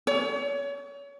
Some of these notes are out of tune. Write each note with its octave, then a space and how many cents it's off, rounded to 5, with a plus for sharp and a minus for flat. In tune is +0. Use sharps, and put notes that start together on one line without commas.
C#5 +30